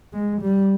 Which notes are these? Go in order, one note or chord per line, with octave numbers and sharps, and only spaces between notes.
G#3
G3